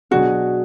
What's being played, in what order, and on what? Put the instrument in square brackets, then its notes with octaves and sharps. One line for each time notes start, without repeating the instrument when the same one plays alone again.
[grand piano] B2 F#3 D4 G#4 [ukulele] F#4